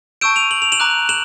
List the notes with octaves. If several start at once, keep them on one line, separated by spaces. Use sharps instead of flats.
A5 C#6 E6 G6 D7 E7
D#7 F7
F#7
F7
E7 F#7
A#5 D6 F#6
E7 F#7